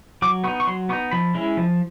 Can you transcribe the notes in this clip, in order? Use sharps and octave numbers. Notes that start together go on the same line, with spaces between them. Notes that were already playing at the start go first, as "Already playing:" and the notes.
F#3 D6
B3 D#4 C#6
C#6
F#3 C6
B3 D#4 C#6
F3 B5
G#3 C#4 E4
F3